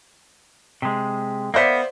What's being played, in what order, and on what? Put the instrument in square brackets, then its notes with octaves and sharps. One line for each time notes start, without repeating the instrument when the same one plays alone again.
[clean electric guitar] C3 G#3
[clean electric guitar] A#3 B3 [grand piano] C5 D5 E5